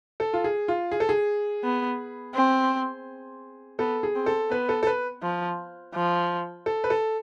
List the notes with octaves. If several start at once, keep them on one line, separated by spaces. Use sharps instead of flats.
A4
F4
G#4
F4
G#4
A4
G#4
B3
C4
B3 A4
G#4
C4
A4
B3 B4
A4
A4
B4
F3
F3
A4
B4
A4